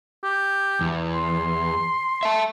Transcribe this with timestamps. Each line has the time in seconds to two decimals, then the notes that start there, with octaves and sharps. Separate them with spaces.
0.24 G4
0.81 E2
1.15 C6
2.23 E5 A5